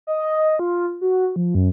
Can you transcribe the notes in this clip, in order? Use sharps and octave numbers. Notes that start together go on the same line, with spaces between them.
D#5
F4
F#4
F3
F#2